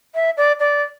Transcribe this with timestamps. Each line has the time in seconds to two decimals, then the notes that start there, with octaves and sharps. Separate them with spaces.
0.15 E5
0.37 D5
0.60 D5